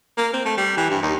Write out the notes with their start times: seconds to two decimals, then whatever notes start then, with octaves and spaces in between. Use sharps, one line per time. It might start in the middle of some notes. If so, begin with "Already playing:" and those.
0.18 A#3
0.34 C4
0.45 A3
0.57 G3
0.77 E3
0.90 G2
1.03 D#2